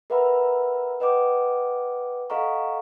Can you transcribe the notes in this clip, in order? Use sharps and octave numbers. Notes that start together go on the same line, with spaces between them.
A#4 B4 E5 F#5 A#5 B5
B4 D#5 F#5 G5 D6
A4 D#5 F5 F#5 A#5 C#6